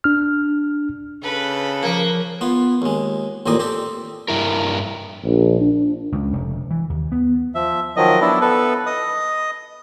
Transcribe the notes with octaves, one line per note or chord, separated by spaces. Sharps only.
D4 F6
C#3 A4 B4
F3 A#3
B3 F4
D#2 G#3
A1 D#2 A#2 C4 D5 D#6
C4 G4 A4
G2 E4 A#4
A#1
D4
C#2
F1
E3
D#2
B3
F3 E5
D#3 F3 F#3 D#5
F#3 B3 D4 E4
B3 A4 B4
D#5 D#6